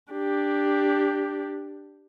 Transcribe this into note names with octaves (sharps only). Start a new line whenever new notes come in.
D4 G4